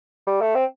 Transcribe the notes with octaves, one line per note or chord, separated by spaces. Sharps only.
G3
A3
C4